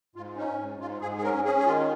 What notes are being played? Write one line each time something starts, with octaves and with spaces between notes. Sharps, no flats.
G#2 F4
C#4 D#4
G#2
G#2 F4
G#2 G#4
G#4
C#4 A#4
C#4 G#4
G#4
D#3 F4